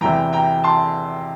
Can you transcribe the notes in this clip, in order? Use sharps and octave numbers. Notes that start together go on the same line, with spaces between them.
E2 C3 E3 G5 A#5
G5 A#5
A5 C6